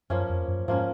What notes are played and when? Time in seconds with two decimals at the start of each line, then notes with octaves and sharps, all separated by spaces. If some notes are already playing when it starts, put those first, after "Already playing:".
0.10 F#2 F3 A#3 C#4
0.29 F2
0.48 F#2
0.68 G#2 F3 A#3 C#4